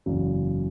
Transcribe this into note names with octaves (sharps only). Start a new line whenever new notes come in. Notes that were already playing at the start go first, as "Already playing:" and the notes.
F#1 E2 C#3 F#3 C#4